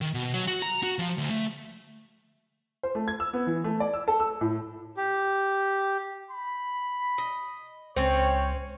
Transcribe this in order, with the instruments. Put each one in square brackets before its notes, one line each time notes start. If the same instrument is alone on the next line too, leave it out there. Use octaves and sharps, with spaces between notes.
[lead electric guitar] D#3
B2
F#3
F#4
A#5
F#4
F3
D2
A3
[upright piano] C5
A3
G#6
E6
B3
E3
A3
D5
E6
A4
E6
A2
[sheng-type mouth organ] G4
[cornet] B5
[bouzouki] D#5
[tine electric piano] C#2 C5 [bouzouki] C4 C#4 [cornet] C#5